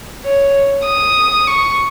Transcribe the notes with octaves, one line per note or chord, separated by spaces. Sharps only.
C#5
D#6
C#6